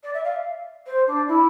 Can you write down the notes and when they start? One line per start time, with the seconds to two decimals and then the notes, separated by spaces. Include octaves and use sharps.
0.03 D5
0.14 E5
0.24 F5
0.86 C5
1.07 D4
1.28 E4